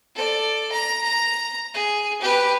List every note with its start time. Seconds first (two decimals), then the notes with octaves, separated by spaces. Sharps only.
0.15 A4 D5
0.72 A#5
1.04 A#5
1.74 G#4
2.21 G4 B4